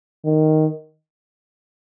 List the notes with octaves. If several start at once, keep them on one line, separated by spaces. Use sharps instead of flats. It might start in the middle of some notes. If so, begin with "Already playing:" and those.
D#3